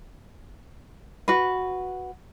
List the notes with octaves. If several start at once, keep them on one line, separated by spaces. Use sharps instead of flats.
F#4 B4